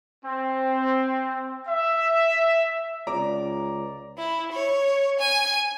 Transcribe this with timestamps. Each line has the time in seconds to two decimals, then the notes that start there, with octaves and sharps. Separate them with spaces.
0.24 C4
1.68 E5
3.07 C#2 D5 A#5
4.18 E4
4.52 C#5
5.19 G#5